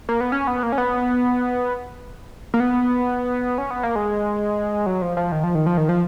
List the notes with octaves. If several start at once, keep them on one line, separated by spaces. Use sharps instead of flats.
A#3
B3
C#4
B3
A#3
C#4
B3
A#3
B3
C#4
B3
A#3
G#3
F#3
F3
F3
D#3
F3
D#3
F3
D#3
F3